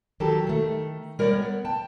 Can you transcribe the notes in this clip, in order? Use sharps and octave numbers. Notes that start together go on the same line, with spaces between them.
D#3 F#3 G4 A4
D#3 A3
G3 A#4 C#5 D5
B3
G5 A5